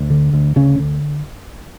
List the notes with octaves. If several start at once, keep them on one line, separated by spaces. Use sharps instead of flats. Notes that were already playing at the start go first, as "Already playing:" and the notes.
Already playing: D2
D3
D2
D2 C#3 C#4
D3